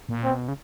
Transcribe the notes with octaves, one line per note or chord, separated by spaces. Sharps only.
A#2
C4
B2
C#3